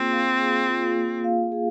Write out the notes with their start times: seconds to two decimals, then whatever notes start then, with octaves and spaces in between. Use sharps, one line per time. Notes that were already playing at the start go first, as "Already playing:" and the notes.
Already playing: A#3 C4 F4 G#4
0.12 F5
0.40 G#4
0.68 F4
0.96 A#3
1.24 F5
1.52 G#4